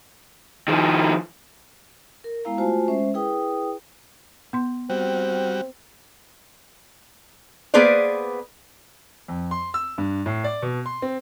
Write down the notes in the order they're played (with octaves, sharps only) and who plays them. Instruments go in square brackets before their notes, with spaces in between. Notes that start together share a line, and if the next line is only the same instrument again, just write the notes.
[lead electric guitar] D#3 F3
[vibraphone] A#4
G#3 B3 E4 F5 A#5
A3 F4 F#4 C5 G#5 A5
G#3 C#4 C5 E5
E4 G#4 B4 G5 D#6
[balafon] B3 C6
[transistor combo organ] G3 F#4 [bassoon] C4
[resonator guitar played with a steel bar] A#3 B3 G#4 B4 C5 D5
[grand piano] F2
C6
E6
G2
A2
D5
B2
C6
C4